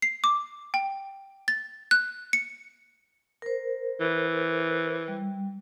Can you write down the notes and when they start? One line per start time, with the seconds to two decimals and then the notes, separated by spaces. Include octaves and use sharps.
0.02 C7
0.24 D6
0.74 G5
1.48 A6
1.91 F#6
2.33 C#7
3.42 A#4 C5
4.00 E3
5.08 G3